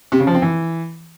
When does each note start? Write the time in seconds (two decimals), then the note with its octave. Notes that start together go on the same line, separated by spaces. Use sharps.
0.12 C3
0.19 C#3
0.27 F3
0.34 C4
0.42 E3